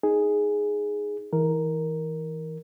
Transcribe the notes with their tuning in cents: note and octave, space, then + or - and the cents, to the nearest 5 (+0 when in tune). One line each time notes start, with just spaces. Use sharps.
D#4 +0 G#4 +0
E3 -30 A#4 +0